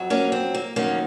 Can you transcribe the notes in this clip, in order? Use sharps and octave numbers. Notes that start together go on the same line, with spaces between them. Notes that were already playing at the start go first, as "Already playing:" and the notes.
Already playing: F2 F#3
A#3 C#4
C4
A#3
F2 D#3 F#3 A#3 C#4